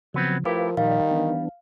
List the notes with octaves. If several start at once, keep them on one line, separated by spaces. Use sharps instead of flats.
C#3 F3 F#3 B3 C4
F3 A3 E4 G4 A#4 B4 F5
A#2 D#3 F3 G3 D5 F5
E3 B3 D4